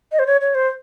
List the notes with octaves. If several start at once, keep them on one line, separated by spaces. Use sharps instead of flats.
D#5
C5
C#5
C#5
C5